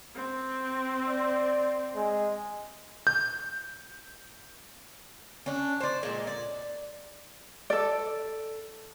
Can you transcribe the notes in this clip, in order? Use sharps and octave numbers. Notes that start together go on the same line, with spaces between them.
C4
D5
G#3
G6
C#4 D4
C5 D5
A#2 G#3
D5
A4 D5